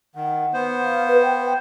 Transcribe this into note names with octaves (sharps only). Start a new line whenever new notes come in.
D#3 F#5
B3 C5
F5
B4
G5